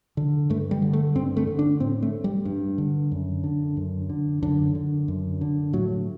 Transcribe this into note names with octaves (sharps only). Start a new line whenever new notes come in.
D3
G2 A3
G3
D3
A3
G2 C4
A3
D3
D4
A2 C4
A3
G3
G2
D3
F#2
D3
F#2
D3
F#2 D3
D3
F#2
D3
A2 F#3